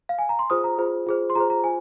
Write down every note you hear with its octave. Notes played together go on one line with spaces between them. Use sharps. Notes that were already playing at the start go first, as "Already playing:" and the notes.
F5
G#5
A#5
C6
F4 G#4 C5 D#6
A#5
F4 G#4 C5
F4 G#4 C5
C6
F4 G#4 C5 A#5
A#5
F4 C5 G#5